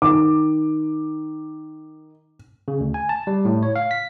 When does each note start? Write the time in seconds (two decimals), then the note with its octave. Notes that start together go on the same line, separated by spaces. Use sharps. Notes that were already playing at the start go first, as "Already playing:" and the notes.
0.02 D#3 D6
2.68 C#3
2.80 D2
2.94 G#5
3.09 A5
3.27 G3
3.45 A2
3.63 C#5
3.76 F5
3.91 B6